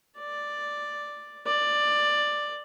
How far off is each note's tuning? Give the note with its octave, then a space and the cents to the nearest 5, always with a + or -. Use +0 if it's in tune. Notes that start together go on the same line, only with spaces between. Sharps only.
D5 +5
D5 +10